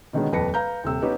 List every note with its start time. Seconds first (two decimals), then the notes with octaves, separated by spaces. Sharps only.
0.13 B2 D3 D#3 G#3 B3 C#4
0.32 D#1 F2 B4 A5 A#6 C#7
0.54 B4 F5 A#5 G6
0.84 D#1 C3 E6
1.02 B3 C#4 D#4 G4 B4